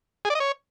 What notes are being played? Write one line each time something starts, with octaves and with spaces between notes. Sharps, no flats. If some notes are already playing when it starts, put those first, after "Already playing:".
G#4
D5
D#5
C#5